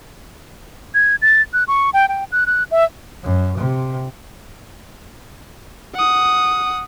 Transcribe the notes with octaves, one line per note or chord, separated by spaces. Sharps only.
G#6
A6
F#6
C#6
G5
G5
F#6
F#6
E5
F#2
C3
F#5 D#6